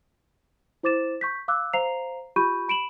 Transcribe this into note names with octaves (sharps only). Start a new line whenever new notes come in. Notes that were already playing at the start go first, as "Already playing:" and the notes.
E4 C5 D6 A6 E7
C#6 G6 B6
F5 D6 E6 F#6
C5 F5 A#5 C7 F7
F4 G4 B5 C#6 G6 D#7
B5 D7 E7 F#7